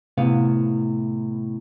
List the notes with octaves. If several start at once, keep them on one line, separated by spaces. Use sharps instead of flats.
A2 C3 B3 F5